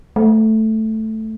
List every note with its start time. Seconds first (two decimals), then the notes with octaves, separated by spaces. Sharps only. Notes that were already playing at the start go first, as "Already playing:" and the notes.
0.16 A3